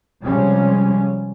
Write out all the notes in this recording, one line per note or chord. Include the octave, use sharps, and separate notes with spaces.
C3 F3 G3 G#3 C#4